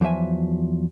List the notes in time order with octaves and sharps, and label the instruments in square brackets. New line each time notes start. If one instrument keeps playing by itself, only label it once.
[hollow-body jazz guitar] E2 F3 F#3 E5 G#5